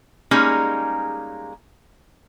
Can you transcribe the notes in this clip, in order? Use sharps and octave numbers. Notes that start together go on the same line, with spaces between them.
G3 G#3 A#3 C#4 D#4 G#4